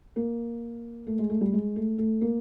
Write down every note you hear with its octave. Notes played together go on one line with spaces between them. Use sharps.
A#3
A3
G#3
A3
G3
G#3
A3
A3
A#3